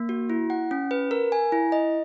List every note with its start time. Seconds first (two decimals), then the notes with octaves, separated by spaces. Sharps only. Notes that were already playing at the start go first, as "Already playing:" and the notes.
Already playing: A#3
0.09 F#4
0.30 E4
0.50 F#5
0.71 C#4
0.91 B4
1.11 A#4
1.32 G#5
1.52 E4
1.72 D#5